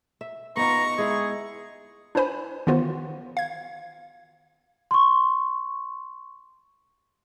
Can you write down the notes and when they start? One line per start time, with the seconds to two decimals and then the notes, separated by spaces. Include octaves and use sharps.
0.21 E5
0.57 B3 D#4 F4 A#5 C#6
0.98 G#3 E4 G#4
2.15 D4 E4 B4 C5 G#5 B5
2.67 D#3 E3 B3 F4 F#4 C5
3.37 F5 G#6
4.91 C6 C#6